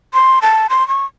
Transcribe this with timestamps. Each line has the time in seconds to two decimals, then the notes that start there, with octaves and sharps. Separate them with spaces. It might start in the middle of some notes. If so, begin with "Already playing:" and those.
0.14 C6
0.42 A5
0.70 C6
0.88 C#6